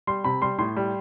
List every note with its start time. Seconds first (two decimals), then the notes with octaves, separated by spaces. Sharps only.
0.07 G3 C6
0.24 C3 B5
0.42 G3 C6
0.59 A2 C6
0.76 G3